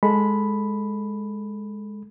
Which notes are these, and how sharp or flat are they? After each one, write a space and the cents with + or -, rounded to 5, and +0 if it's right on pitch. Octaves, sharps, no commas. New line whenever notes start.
G#3 +0 A4 +0 B5 +0